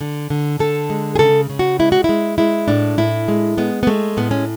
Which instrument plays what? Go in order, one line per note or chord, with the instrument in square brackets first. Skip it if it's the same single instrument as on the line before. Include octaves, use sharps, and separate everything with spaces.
[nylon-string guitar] D3
D3
D3 A4
G#3
G#4
C#3 A4
C#3
F#4
G#3 E4
F#4
G#3 E4
G#3 E4
A2 D4
A2 E4
G#3
G#3 B3
B3
G#3 A3
A2 B3
C#4